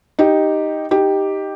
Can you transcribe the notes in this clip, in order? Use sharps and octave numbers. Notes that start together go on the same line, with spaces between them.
D#4 G4
D#4 G4